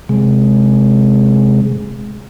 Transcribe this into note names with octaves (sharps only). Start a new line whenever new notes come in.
C3 G#3